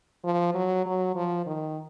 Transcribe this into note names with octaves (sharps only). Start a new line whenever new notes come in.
F3
F#3
F#3
F3
D#3